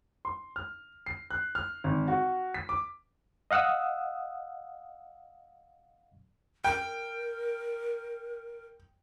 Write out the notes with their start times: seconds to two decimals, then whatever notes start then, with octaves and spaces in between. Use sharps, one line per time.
0.25 C6
0.56 F6
1.06 C7
1.31 F#6
1.55 F6
1.84 G#1
2.08 F#4
2.54 B6
2.69 D6
3.51 D#5 F5 F#5 D#6 E6
6.64 A#4 G5